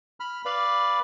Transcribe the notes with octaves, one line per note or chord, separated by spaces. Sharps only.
B5 F6
B4 D5 F5 B5